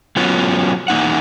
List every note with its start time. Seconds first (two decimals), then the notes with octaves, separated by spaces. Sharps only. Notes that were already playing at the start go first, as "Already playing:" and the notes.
0.16 F#3 B3 C#4 F4 F#4
0.88 E2 A#3 D#4 F#5